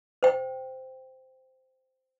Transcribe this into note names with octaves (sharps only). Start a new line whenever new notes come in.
C5 G5